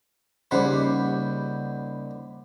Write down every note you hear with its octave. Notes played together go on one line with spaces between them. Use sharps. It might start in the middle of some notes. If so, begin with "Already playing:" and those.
D#2 C#3 G3 C5 F#5 B5